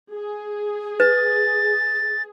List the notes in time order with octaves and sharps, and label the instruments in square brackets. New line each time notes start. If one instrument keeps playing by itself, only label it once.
[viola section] G#4
[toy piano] B4 [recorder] A6